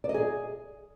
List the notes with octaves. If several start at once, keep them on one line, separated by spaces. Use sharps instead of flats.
D5
D#5
G#4